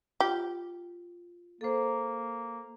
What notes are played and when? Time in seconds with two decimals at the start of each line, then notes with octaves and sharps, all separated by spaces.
0.20 F4 G4
1.61 A#3 A4 C5